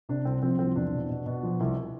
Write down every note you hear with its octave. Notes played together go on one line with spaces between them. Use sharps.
C3 D4
C2 C4
F3 C4
C2 C4
E2 D4
B2
B2
B2
F3
C2